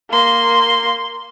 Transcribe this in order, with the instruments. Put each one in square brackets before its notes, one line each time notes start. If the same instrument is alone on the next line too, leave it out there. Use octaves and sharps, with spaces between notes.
[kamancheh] A#3 C6